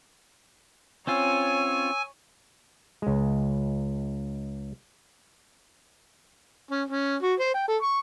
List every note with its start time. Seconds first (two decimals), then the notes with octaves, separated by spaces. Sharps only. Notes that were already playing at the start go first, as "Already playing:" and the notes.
1.07 C4 C#4 F4 C#5 G#5 E6
3.02 C#2 G#3
6.71 C#4
6.88 C#4
7.23 F#4
7.39 C5
7.54 G5
7.68 A4
7.82 C#6